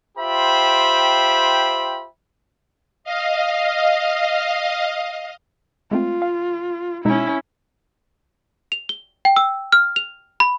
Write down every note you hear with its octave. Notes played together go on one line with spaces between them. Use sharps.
F4 G4 C5 E5 G5 B5
D#5 F5
G#3 A3 C4 F4
F5
B2 G#3 C#4 D#4 E4
F7
G7
G5
E6
F6
F7
B5